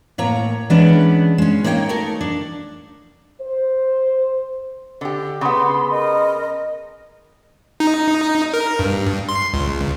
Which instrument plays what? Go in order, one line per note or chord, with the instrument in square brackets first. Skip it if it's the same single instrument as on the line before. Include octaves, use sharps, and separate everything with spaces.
[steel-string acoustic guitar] A2 A#3 C#5 A#5
E3 G#3 B3 C#4 D4 B4
G#3 C#4
A#3 D#4 C#5 E5 G5
A3 D#4 A4 A#4
D4
[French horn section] C5
[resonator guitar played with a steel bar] D3 G4
[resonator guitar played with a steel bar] C#3 B3 [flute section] C6
[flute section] A#4 D#5
[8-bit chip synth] D#4
A#4
G2
C6
C#2